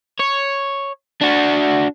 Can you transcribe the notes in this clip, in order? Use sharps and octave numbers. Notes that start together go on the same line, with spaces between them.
C#5
D4 F#4